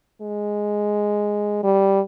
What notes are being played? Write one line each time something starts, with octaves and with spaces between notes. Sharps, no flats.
G#3
G3